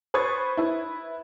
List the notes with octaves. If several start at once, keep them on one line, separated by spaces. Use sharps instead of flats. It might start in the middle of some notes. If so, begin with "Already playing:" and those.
B4 C5 C#6 D#6 G#6 A6
E4 B4